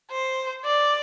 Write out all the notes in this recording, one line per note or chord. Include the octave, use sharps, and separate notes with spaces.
C5
D5